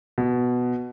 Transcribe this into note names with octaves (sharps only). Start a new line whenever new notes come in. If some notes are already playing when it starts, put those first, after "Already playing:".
B2